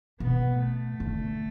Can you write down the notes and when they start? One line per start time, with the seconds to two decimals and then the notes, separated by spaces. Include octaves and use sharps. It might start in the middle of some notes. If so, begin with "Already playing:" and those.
0.20 B2 B3
0.60 A3
1.00 D3